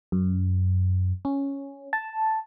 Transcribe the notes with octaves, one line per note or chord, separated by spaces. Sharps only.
F#2
C#4
A5